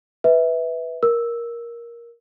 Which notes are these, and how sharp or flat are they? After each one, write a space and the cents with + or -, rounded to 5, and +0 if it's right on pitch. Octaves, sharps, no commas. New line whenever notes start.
B4 +0 E5 -20
A#4 +10 E6 +0